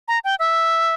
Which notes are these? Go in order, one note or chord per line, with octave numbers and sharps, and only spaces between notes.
A#5
G5
E5